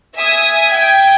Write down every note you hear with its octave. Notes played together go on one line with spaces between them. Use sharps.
E5 G#5 D#6
G5 G#6